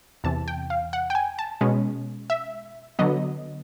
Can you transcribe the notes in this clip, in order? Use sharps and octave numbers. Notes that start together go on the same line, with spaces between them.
E2 C3 E3 A5
G5
F5
F#5
G5
G#5
A5
B2 G#3 C#4
E5
D3 F#3 B3 D#5